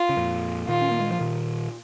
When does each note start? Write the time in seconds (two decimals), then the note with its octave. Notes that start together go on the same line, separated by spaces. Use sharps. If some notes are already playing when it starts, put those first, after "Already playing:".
Already playing: F4
0.09 C#3
0.16 F2 A#2
0.68 A#2 D#3 F4
0.82 C#4
0.91 A#3
1.00 G#3
1.10 F3
1.20 A#2 D#3